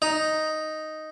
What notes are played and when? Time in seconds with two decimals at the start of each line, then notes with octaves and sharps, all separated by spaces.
0.02 D#4